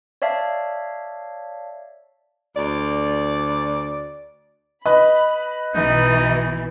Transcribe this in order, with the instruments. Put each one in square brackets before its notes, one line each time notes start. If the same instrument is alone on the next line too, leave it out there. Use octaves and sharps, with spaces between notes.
[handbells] C#5 D5 E5 F5 A5
[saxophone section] D2 D5
[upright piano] B4 D#5 [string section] B5
[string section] B1 B2 E3 [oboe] D#4